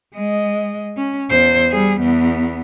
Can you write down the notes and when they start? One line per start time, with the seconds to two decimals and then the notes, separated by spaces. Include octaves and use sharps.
0.14 G#3 D#5
0.97 C#4
1.30 E2 C5
1.71 G3 G#4
2.00 E2 B3